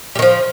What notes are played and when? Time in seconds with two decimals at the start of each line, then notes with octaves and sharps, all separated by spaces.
0.15 G3
0.19 D#3
0.22 F3